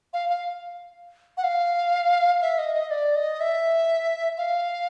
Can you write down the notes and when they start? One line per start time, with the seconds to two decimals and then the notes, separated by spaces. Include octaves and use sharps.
0.13 F5
0.29 F5
1.37 F#5
1.44 F5
2.42 E5
2.58 D#5
2.75 D#5
2.91 D5
3.16 D#5
3.40 E5
4.38 F5